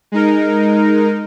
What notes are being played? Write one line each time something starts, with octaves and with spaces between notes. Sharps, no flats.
G#3 D#4 A#4